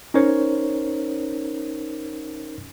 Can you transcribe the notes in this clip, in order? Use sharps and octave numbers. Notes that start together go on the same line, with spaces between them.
C#4 D#4 A#4 C5 C#5